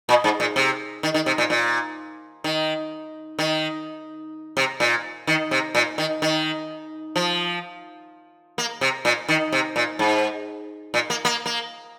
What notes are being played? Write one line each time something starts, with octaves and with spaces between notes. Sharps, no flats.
A#2
G#2
A#2
C3
D#3
D#3
C3
A#2
A#2
D#3
D#3
C3
A#2
D#3
C3
A#2
D#3
D#3
F3
A#3
C3
A#2
D#3
C3
A#2
G#2
A#2
A#3
A#3
A#3